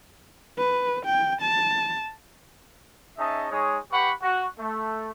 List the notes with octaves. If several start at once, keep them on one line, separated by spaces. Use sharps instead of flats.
B4
G5
A5
C#4 D#4 G#4 D#5 E5 A5
G#3 D#4 G#4 C#5
G4 B4 F#5 B5 C#6
F#4
A3